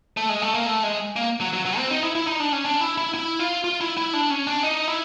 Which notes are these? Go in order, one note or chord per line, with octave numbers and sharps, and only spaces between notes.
A3
G#3
A3
A#3
A3
G#3
A#3
F#3
F#3
F#3
C4
D#4
E4
E4
D#4
D4
C#4
D4
E4
E4
E4
F4
F4
E4
E4
D4
C#4
D4
D#4
E4